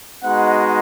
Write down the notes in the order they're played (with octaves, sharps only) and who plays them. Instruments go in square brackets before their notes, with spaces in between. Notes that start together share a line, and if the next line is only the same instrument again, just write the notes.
[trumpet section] G#3 B3 D#4 F#4 F#5